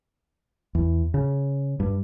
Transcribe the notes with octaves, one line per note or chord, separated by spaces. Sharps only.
E2
C#3
G2